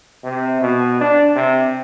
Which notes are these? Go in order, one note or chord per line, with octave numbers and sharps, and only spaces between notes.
C3
B2
D4
C3